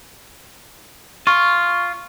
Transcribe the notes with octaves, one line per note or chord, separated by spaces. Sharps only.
F4 C#6